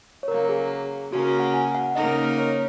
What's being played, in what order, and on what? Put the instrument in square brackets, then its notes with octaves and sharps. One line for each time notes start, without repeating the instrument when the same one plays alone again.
[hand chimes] C#5
[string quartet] C#3 F#3 A#3 [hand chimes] A#4
[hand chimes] G#4
[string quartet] C#3 A#3 C#4 A#4 [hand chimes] F#4
[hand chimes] F#4
F#5
G#5
F#5
[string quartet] C#3 A#3 D#4 A#4 [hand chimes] D#5
[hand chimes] C#5